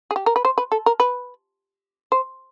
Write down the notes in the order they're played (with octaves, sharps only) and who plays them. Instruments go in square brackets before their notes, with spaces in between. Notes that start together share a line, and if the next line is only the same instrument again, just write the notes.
[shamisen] G#4
G4
A#4
B4
C5
B4
A4
A#4
B4
C5